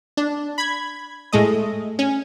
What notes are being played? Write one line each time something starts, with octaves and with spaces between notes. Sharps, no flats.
D4
B5 G#6
A2 G#3 A3 D#5
C#4